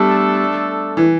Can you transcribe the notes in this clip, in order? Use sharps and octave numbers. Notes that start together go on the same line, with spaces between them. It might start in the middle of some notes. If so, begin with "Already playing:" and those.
Already playing: G3 A3 B3 D4 A4
E3